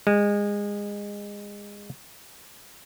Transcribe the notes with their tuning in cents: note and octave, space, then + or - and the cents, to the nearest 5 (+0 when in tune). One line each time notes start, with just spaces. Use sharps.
G#3 -25